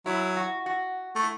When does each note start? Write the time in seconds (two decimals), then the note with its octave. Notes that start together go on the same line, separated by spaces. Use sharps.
0.06 F#3 E4
0.36 F#4
0.66 F#4
1.15 A3
1.23 E4